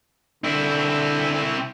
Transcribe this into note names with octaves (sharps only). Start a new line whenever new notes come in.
D3 C4 E4